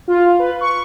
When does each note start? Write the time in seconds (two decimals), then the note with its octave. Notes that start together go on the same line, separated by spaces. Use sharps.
0.08 F4
0.39 B4
0.61 C#6